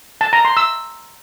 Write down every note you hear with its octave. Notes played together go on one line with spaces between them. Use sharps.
A5
A#5
C6
E6